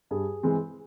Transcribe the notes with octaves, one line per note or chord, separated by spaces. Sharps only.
G2 G#4
E3 G#3 C4